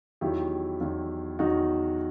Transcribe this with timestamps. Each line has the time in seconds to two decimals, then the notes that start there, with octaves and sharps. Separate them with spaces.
0.21 E2 D#3 F#3 E4 G4
0.81 E2 D#3 F#3
1.39 E2 D#3 F#3 D#4 F#4